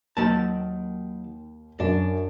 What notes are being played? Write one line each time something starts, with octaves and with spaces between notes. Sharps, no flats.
D#2 D#3 F#3 A5
F#2 D4